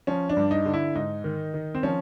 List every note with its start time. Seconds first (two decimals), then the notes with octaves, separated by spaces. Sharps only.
0.07 F3 C#4
0.29 D4
0.37 G2
0.51 D#4
0.66 D3
0.74 E4
0.95 G#2 D#4
1.24 D#3
1.54 D#3
1.75 C4
1.83 F3 C#4